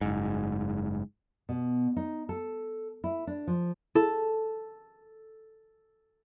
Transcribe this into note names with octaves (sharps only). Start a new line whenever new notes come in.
F#1 G#2
B2
D#4
A4
E4
D4
F3
E4 A4